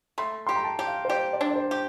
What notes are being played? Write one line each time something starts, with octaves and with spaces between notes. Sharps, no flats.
A3 C6
G4 C6
A#5
A5
G4
F5
C5
G4 D5
D5
D4
D5
C5
G4